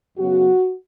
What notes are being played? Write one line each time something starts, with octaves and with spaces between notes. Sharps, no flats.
F#2 C#3 F#3 B3 F#4